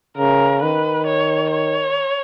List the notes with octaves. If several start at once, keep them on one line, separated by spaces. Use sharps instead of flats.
C#3 A#4
D#3 B4
C#5
C#5